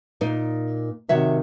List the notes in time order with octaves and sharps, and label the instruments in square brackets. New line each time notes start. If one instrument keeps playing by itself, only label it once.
[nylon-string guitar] A#2 D#4
[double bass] C3 D#3 [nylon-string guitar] F#4 C#5 E5